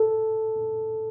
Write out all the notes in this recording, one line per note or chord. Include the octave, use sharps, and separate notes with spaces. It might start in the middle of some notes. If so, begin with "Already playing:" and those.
Already playing: A4